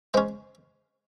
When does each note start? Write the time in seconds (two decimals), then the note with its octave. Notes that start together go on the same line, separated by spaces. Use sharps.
0.14 G#3 C#4 C5